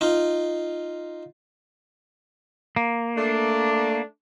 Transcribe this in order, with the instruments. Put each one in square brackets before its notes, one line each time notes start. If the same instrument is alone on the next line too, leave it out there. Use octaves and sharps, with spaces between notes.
[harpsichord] D#4 F4
[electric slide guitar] A#3
[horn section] A3 D4